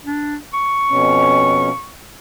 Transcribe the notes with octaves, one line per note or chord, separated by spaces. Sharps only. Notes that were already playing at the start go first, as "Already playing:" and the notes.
D4
C#6
F2 B2 C#4